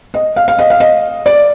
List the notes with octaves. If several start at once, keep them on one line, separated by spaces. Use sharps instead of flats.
D#5
F5
F5
D#5
F5
D#5
D5